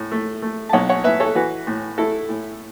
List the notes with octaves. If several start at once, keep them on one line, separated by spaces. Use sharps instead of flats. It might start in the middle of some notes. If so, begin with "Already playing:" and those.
Already playing: A2
A3
A3
A5
B1 C#5 F#5
C#5 F#5
A2 B4 E5
A4 C#5
E3 F#4 B4
A2
A3 E4 A4
A2